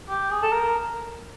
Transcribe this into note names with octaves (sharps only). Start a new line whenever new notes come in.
G4
G#4
A4
A#4